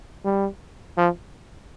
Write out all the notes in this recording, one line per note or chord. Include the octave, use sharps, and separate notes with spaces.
G3
F3